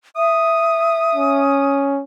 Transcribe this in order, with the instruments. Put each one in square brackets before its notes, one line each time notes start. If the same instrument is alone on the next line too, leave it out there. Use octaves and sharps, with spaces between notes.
[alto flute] E5 [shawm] D#6
[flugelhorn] C#4